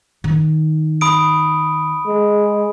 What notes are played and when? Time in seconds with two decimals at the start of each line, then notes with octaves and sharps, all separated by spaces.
0.24 D#3
1.01 B5 D#6 D7
2.07 G#3